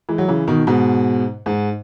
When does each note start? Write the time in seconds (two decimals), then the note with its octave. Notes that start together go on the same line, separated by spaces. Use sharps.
0.09 E3 G#3
0.18 F#3
0.28 C#3 E3
0.48 B2 D#3
0.67 G#2 B2
1.46 G#2